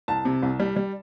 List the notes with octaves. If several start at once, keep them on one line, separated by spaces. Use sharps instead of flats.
C2 A5
C3
C2
G3
G3